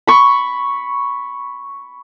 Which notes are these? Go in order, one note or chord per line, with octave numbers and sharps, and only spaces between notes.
B5 C#6